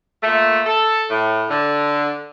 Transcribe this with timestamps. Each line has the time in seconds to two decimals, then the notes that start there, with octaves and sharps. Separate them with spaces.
0.23 A#2 A3
0.66 A4
1.10 A2
1.50 D3